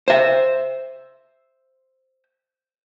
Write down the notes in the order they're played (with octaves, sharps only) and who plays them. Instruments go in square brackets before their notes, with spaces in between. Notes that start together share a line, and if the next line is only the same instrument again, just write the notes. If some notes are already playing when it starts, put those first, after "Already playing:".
[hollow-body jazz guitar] C5 E5